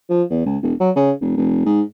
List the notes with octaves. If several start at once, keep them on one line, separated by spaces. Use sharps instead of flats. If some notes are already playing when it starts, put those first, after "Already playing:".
F3
E2
C#2
E1
F#3
C#3
F1
F1
G#2